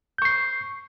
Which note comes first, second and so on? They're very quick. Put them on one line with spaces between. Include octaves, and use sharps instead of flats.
G6 C#6 C7